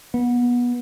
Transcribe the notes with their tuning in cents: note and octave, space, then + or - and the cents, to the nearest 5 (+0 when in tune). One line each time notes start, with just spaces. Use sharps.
B3 -25